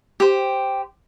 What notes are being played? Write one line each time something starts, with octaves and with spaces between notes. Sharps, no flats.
G4 C5